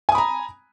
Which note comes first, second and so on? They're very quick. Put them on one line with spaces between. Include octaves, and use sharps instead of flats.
G#5 D#6 B5 A#5